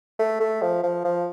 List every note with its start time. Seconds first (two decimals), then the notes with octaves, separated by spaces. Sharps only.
0.19 A3
0.40 A3
0.62 F3
0.83 F3
1.04 F3